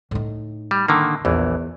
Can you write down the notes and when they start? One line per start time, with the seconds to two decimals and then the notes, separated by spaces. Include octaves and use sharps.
0.11 A2 D#4
0.71 G3
0.88 D3 D#3 A#3
1.25 A#1 E2 E3